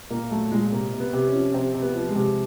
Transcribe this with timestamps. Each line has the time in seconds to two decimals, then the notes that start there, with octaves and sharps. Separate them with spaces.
0.10 A#2 A#3
0.31 F#3 A3
0.52 A#2 G#3
0.72 C3 A#3
0.93 C3
1.00 B3
1.13 C3
1.27 C#4
1.34 F3
1.54 C3 C4
1.74 C3
1.82 B3
1.95 F3
2.09 G#3
2.16 C3